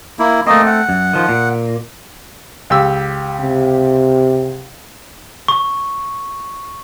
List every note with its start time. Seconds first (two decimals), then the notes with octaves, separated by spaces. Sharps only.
0.19 A#3 E4
0.47 A3 A#3 C4 D#5
0.66 F#5
0.89 F#2
1.13 D#3 F3
1.29 A#2
2.70 C#2 G4 E6
3.41 C3
5.48 C#6